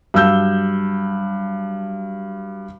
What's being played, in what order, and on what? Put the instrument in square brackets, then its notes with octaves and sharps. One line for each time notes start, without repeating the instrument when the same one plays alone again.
[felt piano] G2 F#3 E6 G6